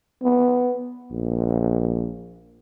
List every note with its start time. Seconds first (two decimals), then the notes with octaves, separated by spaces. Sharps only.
0.23 B3
1.11 A#1